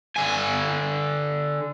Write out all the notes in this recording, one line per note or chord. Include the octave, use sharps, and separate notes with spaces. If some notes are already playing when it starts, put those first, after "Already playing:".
D3 G#5